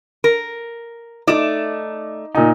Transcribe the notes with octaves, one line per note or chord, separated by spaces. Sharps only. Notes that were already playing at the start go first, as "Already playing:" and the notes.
A#4
A3 D#4 D5 D6 E7
A#2 D#4